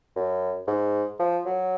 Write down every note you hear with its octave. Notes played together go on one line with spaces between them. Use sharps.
F#2
G#2
F3
F#3